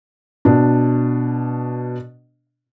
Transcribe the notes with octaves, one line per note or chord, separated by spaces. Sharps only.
B2 D4